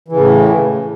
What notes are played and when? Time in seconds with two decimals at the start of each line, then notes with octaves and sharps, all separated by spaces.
0.08 E3
0.12 C#3
0.16 A2